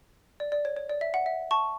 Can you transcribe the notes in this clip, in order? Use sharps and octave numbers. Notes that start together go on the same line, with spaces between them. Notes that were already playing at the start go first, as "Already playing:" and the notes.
D5
D5
C#5
C#5
D5
E5
F#5
E5
A5 C#6